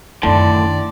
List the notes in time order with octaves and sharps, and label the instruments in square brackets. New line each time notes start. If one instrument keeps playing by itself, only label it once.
[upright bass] F#2 D#3 [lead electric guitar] A2 D3 [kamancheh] D5 [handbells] A5 C6